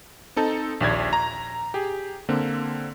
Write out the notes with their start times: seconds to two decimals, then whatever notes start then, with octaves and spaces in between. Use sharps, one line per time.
0.36 C4 D#4 A4
0.81 A#1 D#2 D5 G#6
1.13 A#5
1.74 G4 G#4
2.29 D3 A#3 C4